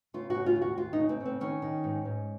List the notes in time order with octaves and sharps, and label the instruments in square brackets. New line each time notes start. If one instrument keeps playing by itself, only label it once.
[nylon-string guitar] C#3 F4
C#3 F#4
F4
D#2
F#4
D#2 F4
D#4
C#3
C4
C#3
C4
D#3 C#4
D#3
G#2
G#2